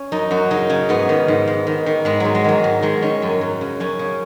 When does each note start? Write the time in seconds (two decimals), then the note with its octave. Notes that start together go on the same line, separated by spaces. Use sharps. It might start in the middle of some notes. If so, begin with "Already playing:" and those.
Already playing: C#4
0.12 F#2 D#4
0.31 F#2 F#4
0.51 C#3 D#4
0.69 C#3 C#4
0.89 G#2 B3
1.09 D#3
1.28 G#2
1.47 G#2
1.67 D#3
1.86 D#3
2.05 G#2 G#3
2.20 G#2 F#3
2.35 G#3
2.45 D#3 F#3
2.64 G#2
2.82 D#3 G#3
3.02 D#3 C#4
3.22 F#2
3.41 F#2
3.61 C#3
3.80 F#2 C#4
3.99 C#3